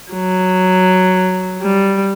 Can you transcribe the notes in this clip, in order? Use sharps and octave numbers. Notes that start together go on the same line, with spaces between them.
F#3
G3